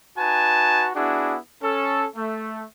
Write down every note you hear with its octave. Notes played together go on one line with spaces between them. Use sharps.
D#4 F#4 B4 G#5 A5
B3 D4 E4 F#4 G#4
C#4 A4
A3